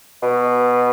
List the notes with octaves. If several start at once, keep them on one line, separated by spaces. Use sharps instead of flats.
B2